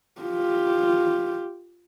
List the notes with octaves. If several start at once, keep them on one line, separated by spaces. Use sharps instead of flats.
F4 G4